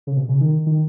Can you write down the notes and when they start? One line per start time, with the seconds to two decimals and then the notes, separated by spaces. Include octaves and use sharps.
0.07 C#3
0.17 B2
0.29 C#3
0.41 D#3
0.66 D#3